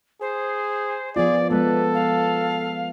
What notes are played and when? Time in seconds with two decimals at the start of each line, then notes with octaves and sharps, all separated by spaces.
0.21 G#4 C5
1.16 F3 B3 F4 G#4 D5
1.51 F3 G#3 B3 A4 B4
1.94 F5